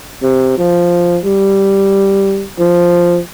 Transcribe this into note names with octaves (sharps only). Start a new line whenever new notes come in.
C3
F3
G3
F3